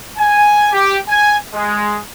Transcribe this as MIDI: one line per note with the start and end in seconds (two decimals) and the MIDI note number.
0.18 0.68 80
0.72 0.97 67
1.08 1.36 80
1.53 1.98 56